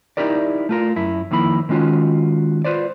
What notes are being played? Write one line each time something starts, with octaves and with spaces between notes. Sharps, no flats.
D#4 E4 F#4 G4 A#4 D5
A3 F4 A#4
F#2 E4
F2 D#3 A#3 E4 B5
D#3 G#3 C#4 F4 F#4
F4 B4 C5 D5